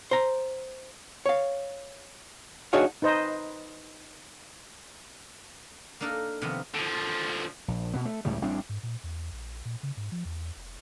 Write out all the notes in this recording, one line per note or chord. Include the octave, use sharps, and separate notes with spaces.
C5 A#5
C#5 F5
D4 D#4 F#4 G#4 C#5 F5
D#4 B4 C5 D#5
A#3 D4 D#4 A4 A#4
C3 D#3 F3 A#3 B3
D3 F3
A#1
B2 B3
A3
C#2 A2 C#3 G3
A1 G3 C4 D4
G#2
A#2
E2
A#1
A#2
C#3
G#2
F3
E2
F1